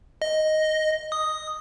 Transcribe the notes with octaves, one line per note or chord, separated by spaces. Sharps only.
D#5
D#6